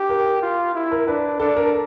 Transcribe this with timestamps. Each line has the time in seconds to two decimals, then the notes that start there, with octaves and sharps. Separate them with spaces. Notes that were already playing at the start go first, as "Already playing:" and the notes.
Already playing: G4
0.09 A#4
0.42 F4
0.75 E4
0.91 A#4
1.07 D4 B4
1.40 D4 A4
1.57 A#4